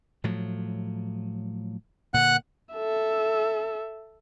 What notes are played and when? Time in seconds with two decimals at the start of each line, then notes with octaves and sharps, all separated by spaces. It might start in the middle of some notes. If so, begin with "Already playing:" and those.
0.24 A2 F3 F#3
2.14 A#2 D3 F#5 F#6
2.74 A4 E5